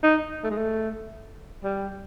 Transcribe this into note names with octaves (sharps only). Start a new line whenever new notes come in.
D#4
A3
G#3
A3
G3